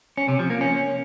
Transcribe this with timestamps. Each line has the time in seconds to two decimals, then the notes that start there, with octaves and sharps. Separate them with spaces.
0.17 C#4
0.28 C3
0.39 F3
0.50 A#3
0.61 C#4